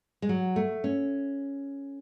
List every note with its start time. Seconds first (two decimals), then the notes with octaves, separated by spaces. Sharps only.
0.22 G#3
0.29 F#3
0.56 A3
0.84 C#4